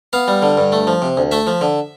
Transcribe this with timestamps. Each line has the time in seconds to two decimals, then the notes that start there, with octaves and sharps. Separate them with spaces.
0.13 B3 F5
0.28 G3
0.42 D3
0.58 G2
0.72 A3
0.87 F3
1.02 C3
1.17 D2
1.31 A3 E5
1.47 F3
1.61 D3